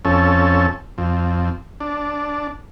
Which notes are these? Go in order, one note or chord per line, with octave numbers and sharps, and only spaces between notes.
F2 C#4 A4
F2
D4